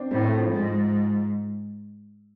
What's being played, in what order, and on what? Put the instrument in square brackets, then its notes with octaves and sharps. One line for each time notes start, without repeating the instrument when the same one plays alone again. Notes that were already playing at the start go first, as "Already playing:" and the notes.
Already playing: [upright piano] C4 D4
[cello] A2 [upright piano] C4
[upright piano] A3
F3
[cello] G#2